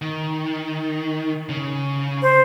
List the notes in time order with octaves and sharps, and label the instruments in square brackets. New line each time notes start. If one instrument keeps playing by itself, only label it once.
[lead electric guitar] D#3
C#3
[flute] C5